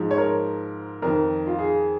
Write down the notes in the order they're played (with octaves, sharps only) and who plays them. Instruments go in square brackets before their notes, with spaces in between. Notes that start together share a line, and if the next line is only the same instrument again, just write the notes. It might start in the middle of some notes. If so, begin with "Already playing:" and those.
Already playing: [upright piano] G#2 F3
C#5
A#4
F2 D#3 A#4
F4
G#4